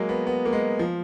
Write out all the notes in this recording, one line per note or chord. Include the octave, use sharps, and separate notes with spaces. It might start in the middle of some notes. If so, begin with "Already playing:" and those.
Already playing: F#3 G#3 A#3
B3
B3
A#3
G#3
F3